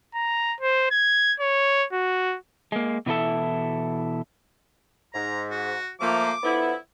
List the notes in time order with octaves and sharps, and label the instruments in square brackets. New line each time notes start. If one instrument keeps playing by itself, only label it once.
[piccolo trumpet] A#5
C5
G#6
C#5
F#4
[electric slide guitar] G#3 A#3
B2 E3 E4 A4 E5
[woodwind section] G#2 [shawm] A#5
[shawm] F#4
[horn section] F3 A#3 [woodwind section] A3 [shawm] D6
[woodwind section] D3 F3 B3 [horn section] E4